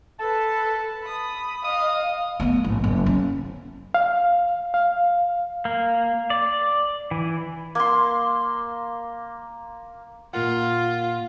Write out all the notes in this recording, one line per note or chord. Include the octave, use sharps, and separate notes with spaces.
A4 B4 A5
B5 D#6
D#5 F5 D#6
A3 B3
A1
F#1
C#4
F5
F5
A#3
D5
E3
A#3 C6
A#2 F4 A#4 F#5